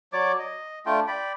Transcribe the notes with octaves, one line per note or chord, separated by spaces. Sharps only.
F#3 C#5 D5 D6
D#5
A3 D4 F4 G5
D5 G5 B5